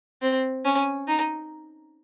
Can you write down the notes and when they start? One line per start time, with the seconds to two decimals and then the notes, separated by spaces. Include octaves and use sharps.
0.22 C4
0.65 C#4
1.08 D#4